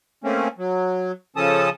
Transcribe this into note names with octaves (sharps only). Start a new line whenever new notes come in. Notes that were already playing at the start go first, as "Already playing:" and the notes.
A3 A#3 C4 C#4
F#3
C#3 F3 C#4 A4 A5 D#6